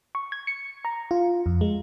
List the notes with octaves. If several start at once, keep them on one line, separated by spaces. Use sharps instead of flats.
C#6
G#6
C#7
A#5
F4
F2
G#3